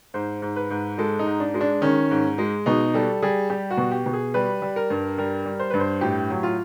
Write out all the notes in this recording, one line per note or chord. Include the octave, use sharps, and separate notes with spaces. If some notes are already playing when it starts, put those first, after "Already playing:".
G#2 C5
G#2
B4
G#2
G#3 A4
D#4
G#2
D4
G#3
D4
D#3 C#4
G#2
G#3
B2 D#4
G3 A4
G3 G#4
G3 G4
F#4
B2
G4
B2
G#4
G3 B4
G3
A#4
G2
G3 A#4
G3
C5
G2 B4
C5
A2 G4
F#3
F4